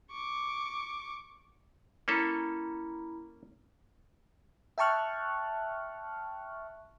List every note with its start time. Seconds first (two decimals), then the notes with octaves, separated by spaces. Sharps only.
0.11 C#6 D6
2.08 A#3 C#4 E4 A4 A#5 B5
4.78 E5 G5 A5 C#6 F6 F#6